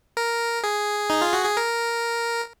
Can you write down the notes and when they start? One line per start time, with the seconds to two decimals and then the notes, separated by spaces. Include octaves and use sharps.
0.17 A#4
0.64 G#4
1.10 D#4
1.21 F4
1.33 F#4
1.45 G#4
1.57 A#4